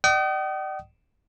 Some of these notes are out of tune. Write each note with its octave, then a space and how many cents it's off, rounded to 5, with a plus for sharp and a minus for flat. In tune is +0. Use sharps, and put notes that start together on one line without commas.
D5 +45 G5 -45 D#6 +0